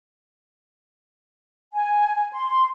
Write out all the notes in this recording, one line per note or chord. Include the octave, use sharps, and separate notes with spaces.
G#5
G#5
C6